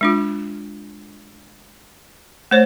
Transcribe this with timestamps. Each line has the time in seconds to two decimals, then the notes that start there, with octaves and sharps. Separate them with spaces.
0.01 G#3 D4 F4
2.51 A3 C5 C#5